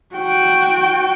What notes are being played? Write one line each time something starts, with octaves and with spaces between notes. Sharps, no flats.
F#4 G5